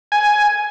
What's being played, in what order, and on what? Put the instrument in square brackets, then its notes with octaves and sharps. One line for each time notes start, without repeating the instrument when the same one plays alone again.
[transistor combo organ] G#5